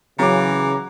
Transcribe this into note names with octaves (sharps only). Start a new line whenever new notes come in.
C#3 E3 F#3 A#5 D6